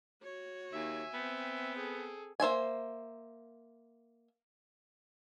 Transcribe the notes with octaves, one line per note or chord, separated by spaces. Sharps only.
F#4 C#5
D#2 E5 G#5
B3 C4 G5
G#4 A4
A#3 C5 E5 G#5